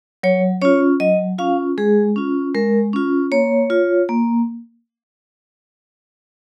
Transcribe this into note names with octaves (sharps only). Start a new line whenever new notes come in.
F#3 C#5
C#4 F4 C#5
F#3 D#5
C#4 F4 F5
G#3 G#4
C#4 F4
G#3 A#4
C#4 F4
A#3 C#5
F4
A#3